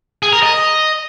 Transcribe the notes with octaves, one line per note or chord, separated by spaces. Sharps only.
G#4
A#4
D#5